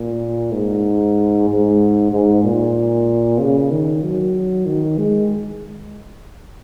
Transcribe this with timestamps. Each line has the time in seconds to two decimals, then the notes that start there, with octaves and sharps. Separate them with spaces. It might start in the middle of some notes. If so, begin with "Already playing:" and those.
Already playing: A#2
0.53 G#2
1.49 G#2
2.12 G#2
2.44 A#2
3.39 C#3
3.71 D#3
4.03 F#3
4.66 D#3
4.98 G#3